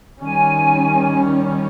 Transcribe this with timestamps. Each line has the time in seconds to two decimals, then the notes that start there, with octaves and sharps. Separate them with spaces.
0.20 D#3 G3 C#4 G#5